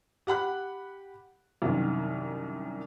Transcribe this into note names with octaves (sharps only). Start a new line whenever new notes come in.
G4 F#5 B5 F#6
C2 F#2 D#3